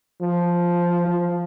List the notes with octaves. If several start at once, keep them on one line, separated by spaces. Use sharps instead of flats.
F3
F3